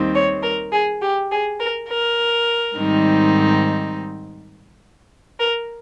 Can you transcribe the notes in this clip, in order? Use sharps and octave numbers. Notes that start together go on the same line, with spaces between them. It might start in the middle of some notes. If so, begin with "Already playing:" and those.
Already playing: D#2 D#3 G3 C4 D#4
C#5
A#4
G#4
G4
G#4
A#4
A#4
G#2 D#3 G3 C4 D#4
A#4